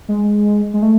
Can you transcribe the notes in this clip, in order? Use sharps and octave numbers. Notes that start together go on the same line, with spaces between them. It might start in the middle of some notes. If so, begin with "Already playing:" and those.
G#3
G#3
A3